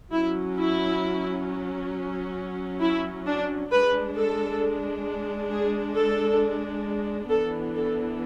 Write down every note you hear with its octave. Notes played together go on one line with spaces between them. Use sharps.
F#3 C#4 E4
E4
E4
D4
G#3 D4 B4
A4
G#4
A4
E3 B3 D4 A4
A4